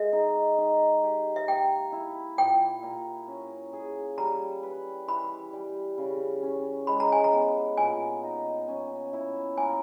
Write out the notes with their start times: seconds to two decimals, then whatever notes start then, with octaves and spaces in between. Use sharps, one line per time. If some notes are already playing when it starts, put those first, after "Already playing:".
Already playing: G#3 E5
0.13 D#4
0.58 D#3
1.03 G4
1.36 E5
1.48 A#3 G5
1.92 E4
2.38 A#2 G5
2.83 A#2
3.28 C#4
3.73 G#4
4.18 G3 A#5
4.63 B4
5.08 E3 B5
5.53 G3
5.98 C#3
6.43 C#4
6.87 G#3 B5
7.00 A#5
7.12 G#5
7.24 A#5
7.33 B3
7.77 A#2 G#5
8.23 D#4
8.68 C#4
9.13 E4
9.58 A#3 G#5